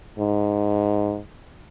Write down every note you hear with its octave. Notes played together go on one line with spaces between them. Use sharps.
G#2